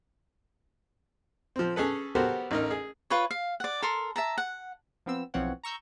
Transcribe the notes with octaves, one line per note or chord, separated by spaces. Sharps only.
F3 C4
C#4 G#4 A4 B4
B3 F#4 G4 A4 A#4 C5
A1 D#4 A#4
G#4
F4 B4 C#5
F5
D5 F#5
A4 A#4 C6
E5 A5 A#5
F#5
F3 B3 C4 E6
B1 E3 F3 C4 C#5 F#5
A#5 C#6 E6 G6